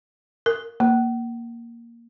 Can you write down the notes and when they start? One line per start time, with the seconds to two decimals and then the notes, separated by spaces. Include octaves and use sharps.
0.46 A#4
0.80 A#3